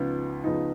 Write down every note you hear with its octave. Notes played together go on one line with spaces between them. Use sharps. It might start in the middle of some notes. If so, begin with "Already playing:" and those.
Already playing: C#2 C#3 F3 B3 D#4
C#2 C#3 F3 B3 D#4